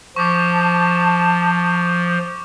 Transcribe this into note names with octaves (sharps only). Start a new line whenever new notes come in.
F3 A5 C#6 D6